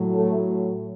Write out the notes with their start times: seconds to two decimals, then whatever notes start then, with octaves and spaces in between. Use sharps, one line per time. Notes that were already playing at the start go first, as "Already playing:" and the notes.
Already playing: A2 F#3
0.15 A3